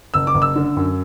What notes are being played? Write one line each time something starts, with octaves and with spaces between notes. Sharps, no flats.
F#1 E6
D6
F#1
E6
D3
F#2